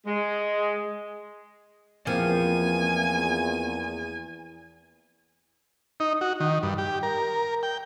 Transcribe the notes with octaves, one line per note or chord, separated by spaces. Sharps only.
G#3
E2 F3 A#3 C4 G#5
D#4
F#4
D#3
G2
G4
A#4
G5